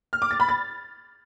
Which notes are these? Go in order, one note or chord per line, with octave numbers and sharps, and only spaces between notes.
F6
D6
A6
B5
A6